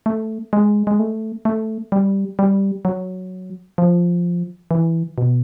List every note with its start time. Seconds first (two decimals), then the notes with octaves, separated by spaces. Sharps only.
0.06 A3
0.53 G#3
0.87 G#3
0.99 A3
1.45 A3
1.92 G3
2.39 G3
2.85 F#3
3.78 F3
4.71 E3
5.18 B2